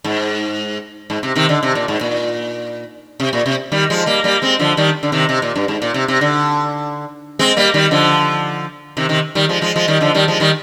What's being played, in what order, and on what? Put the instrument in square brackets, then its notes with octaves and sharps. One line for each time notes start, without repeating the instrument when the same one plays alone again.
[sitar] G#2
G#2
C3
C3 D#3
D3
C3
A#2
G#2
A#2
C3
A#2
C3
D#3 G3
F3 G#3
G3 A#3
G3 A#3
G#3 C4
D3 F3
D#3 G3
D3
C3 D#3
C3
A#2
G2
G#2
A#2
C3
C3
D3
G#3 C4
G3 A#3
D#3 G3
D3 F3
C3 D#3
C3 D#3
D#3 G3
F3 G#3
F3 G#3
F3 G#3
D#3 G3
D3 F3
D#3 G3
F3 G#3
D#3 G3